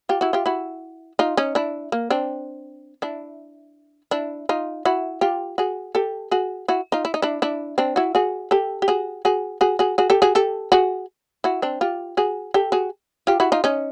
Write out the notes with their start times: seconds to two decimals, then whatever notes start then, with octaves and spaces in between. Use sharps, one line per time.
0.09 F4 G4
0.21 E4 F#4
0.33 F4 G4
0.46 E4 F#4
1.19 D#4 F4
1.37 C#4 D#4
1.55 D4 E4
1.92 A#3
2.10 C4 D4
3.02 D4 E4
4.11 D4 E4
4.49 D#4 F4
4.85 E4 F#4
5.21 F4 G4
5.58 F#4 G#4
5.95 G4 A4
6.31 F#4 G#4
6.68 E4 F#4
6.92 D#4 F4
7.05 E4
7.14 D#4
7.22 D4 E4
7.42 D4 E4
7.78 C4 D4
7.96 E4 F#4
8.15 F#4 G#4
8.51 G4 A4
8.82 G4
8.88 F#4 G#4
9.25 F#4 G#4
9.61 F#4 G#4
9.79 F#4 G#4
9.98 F#4 G#4
10.10 G4 A4
10.22 F#4 G#4
10.35 G4 A4
10.72 F#4 G#4
11.44 E4 F#4
11.62 C4 D4
11.81 F4 G4
12.17 F#4 G#4
12.54 G4 A4
12.72 F#4 G#4
13.27 F4 G4
13.40 E4 F#4
13.52 D#4 F4
13.64 C#4 D#4